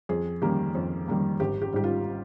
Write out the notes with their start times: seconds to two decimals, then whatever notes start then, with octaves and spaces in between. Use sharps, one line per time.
0.09 F2 G#4
0.42 D#3 G3 A#3 G4
0.75 F2
1.08 D#3 G3 A#3
1.40 G#1 G4
1.62 G4
1.73 G#2 G3 G4
1.84 F4